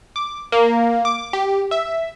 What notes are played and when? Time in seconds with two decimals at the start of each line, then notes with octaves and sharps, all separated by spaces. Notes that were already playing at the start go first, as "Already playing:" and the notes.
0.16 D6
0.52 A#3
1.05 D6
1.33 G4
1.71 E5